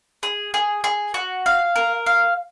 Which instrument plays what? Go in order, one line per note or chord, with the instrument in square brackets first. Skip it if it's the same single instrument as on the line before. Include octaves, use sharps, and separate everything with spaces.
[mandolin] G#4
G#4
G#4
F#4
F5
A#4
F5